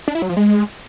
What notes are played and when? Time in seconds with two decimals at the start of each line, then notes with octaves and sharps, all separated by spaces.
0.08 D4
0.15 E4
0.22 F#3
0.29 F3
0.37 G#3